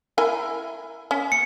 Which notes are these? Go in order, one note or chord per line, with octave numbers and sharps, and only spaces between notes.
E4 A#4 G#5
C#4
C#7